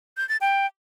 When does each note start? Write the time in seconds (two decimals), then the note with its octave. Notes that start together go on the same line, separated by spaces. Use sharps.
0.17 G6
0.29 A6
0.41 G5